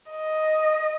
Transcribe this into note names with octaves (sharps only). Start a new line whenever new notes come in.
D#5